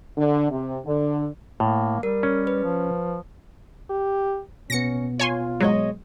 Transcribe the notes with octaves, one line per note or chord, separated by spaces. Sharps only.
D3
C3
D3
A2 A#3
G3 A#4
C#4
B4
F3
G4
B2 B3 C#4 A#6 C#7
F4 C#5 G#5 C6
F#3 G#3 C#5 D#5